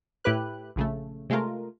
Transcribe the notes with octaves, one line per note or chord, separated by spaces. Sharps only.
A2 E4 G4 B4 F#6
A#1 C#3 A3
C3 G#3 A3 F4 A#4